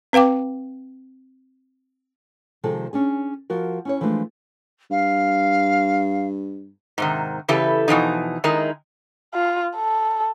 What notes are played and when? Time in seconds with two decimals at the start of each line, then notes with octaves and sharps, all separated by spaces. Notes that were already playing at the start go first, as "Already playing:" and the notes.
0.13 C4 B4 F5 G5 D6
2.64 C3 D#3 F3 G#3 G#4 A4
2.93 C#4 D4 G#4
3.50 F3 F#4 A#4
3.85 C#4 E4 C#5
4.01 E3 F3 G#3 A3 D4
4.90 G2 F5
6.98 G#2 C3 D#3
7.48 C#3 E3 E4 G4 A4 B4
7.88 B2 E3 F3 D#4
8.44 D#3 G#3 D#4 E4 A#4
9.34 F4
9.76 A4